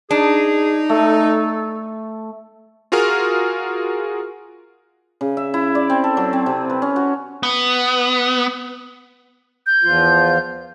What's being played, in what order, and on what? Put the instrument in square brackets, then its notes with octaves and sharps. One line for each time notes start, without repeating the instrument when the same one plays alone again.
[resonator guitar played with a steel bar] D4 [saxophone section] D#4 [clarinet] G#4
[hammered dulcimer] A3 [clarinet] A4
[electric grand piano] F4 F#4 G#4 A#4 F6
[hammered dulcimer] C#3
E5
E4
D5
C4
A4
F#3
C4
C3
B4
C#4
F#4
[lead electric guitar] B3
[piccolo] G6
[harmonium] E2 F3 F4